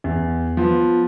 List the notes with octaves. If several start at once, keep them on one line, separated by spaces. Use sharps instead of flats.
E2
F3 B3